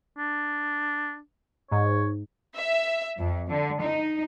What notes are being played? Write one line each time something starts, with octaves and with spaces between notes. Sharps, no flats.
D4
G#2 C#5
E5
F2
D3
D#4